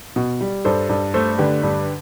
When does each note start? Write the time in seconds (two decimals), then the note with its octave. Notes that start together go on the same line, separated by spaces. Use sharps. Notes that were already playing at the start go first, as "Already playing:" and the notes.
0.16 B2
0.41 G3
0.65 G2 A4 C5
0.89 G2
1.14 A3 A4 C5
1.38 D3 G4 B4
1.63 G2